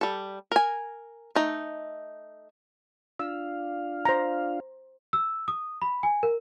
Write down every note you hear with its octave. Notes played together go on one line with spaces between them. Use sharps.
G3 A4
A#4 G#5
A3 D#4
D4 F4 F5 E6
C5 A#5
E6
D#6
B5
G#5
A#4